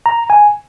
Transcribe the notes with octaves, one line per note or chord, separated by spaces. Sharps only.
A#5
G#5